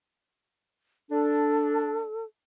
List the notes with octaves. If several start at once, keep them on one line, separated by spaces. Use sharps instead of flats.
D4 A4